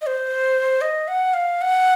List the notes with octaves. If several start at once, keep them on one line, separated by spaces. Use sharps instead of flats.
D#5
C5
D#5
F#5
F5
F#5